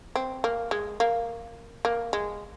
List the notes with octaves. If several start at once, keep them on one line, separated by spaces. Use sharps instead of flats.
C4
A#3
G#3
A#3
A#3
G#3